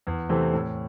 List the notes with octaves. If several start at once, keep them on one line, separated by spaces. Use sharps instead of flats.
E2
C3 E3 A3 C4
A2